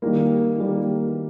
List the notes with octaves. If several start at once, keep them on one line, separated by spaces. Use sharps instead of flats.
D#3 G3 A#3
D#3 G3 A#3